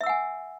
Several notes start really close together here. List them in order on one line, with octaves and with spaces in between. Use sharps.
E5 E6 F#5 G#5